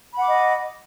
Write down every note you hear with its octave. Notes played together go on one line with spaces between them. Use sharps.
D#5 F#5 B5 D6